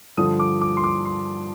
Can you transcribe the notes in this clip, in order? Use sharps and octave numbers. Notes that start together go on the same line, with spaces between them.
G2 D3 F3 D#6
D6
D6
C6
D6
C6